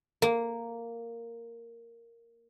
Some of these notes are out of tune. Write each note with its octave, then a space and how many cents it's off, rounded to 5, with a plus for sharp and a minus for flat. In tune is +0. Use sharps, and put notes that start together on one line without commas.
A#3 -5